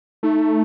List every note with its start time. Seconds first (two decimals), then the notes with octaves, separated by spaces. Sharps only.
0.23 A3 D#4